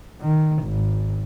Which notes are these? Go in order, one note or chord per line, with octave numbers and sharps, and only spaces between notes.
D#3
G#1